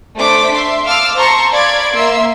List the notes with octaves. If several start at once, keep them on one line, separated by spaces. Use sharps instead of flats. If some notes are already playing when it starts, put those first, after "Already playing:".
A3 D4 C5 D6 B6
E5 C6
F5 A5 C6 D6 E6 F6
C5 A5 A#5 C6 C#6
D5 F5 B5 G#6 D7
A#3 E5 C6 E6